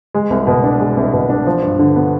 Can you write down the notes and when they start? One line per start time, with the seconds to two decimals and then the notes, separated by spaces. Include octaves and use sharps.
0.14 G#3
0.30 C2
0.47 B2
0.64 D4
0.80 G#3
0.97 C2
1.13 B2
1.30 D4
1.47 F3
1.62 G2
1.79 D3
1.96 B3